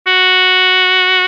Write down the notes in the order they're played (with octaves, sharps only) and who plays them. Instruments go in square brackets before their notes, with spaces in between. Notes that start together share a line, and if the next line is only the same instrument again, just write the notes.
[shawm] F#4